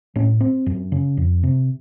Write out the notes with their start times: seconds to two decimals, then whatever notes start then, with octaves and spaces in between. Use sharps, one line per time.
0.16 A2 C#4
0.41 C4
0.66 F#2
0.92 C#3
1.17 F2
1.43 C3